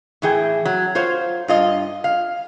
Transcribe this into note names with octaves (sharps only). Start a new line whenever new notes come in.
A2 E3 G#4 G5
F#3
F4 C5 C#5 F5
G2 F4 D#5
F5